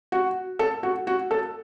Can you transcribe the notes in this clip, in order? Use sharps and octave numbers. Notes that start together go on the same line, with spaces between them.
F#4
A4
F#4
F#4
A4